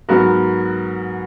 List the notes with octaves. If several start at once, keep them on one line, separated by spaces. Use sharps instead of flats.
G#2 F#3 B3 F#4 A#4